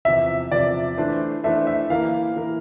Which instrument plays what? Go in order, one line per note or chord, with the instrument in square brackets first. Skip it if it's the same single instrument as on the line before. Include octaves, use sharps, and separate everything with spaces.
[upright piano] E2 C3 F3 [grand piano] E5
[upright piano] E2 C3 F3 [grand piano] D5
[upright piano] E3 A3 D4 A4 C5
[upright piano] E3 A3 D4 A4 C5 [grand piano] E5
[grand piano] E5
[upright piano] E3 A#3 E4 A#4 [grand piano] F5
[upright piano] E3 A#3 E4 A#4